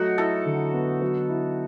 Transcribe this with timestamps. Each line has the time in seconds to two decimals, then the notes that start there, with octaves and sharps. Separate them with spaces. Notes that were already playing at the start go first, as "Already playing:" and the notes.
Already playing: F#3 A3 D#4 F#4
0.18 E4 A4
0.46 D3
0.73 B3
1.01 F#3
1.29 E4